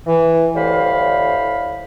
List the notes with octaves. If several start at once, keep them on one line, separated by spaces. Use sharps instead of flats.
E3
D2 A2 G3 C5 F5 B5